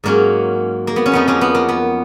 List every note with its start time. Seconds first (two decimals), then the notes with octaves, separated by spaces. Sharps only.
0.04 G#2 F#3 A#3 C#4
0.87 A#3
0.96 B3
1.06 C#4
1.12 F2 F3 B3 D#4
1.28 A#3 C#4
1.41 B3
1.55 A#3
1.69 B3